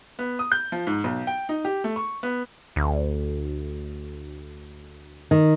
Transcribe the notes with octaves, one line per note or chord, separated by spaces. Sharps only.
B3
D#6
G6
F3
G#2
B1
G5
D#4
G4
A3
C#6
B3
D2
D#3